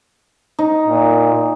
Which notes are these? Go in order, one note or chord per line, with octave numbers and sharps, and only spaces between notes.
D#4
A#2